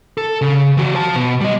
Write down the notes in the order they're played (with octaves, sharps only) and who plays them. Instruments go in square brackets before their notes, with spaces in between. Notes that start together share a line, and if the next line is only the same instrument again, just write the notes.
[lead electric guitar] A4
C#3
E3 F#4
C5 A5
B2
G3 D#5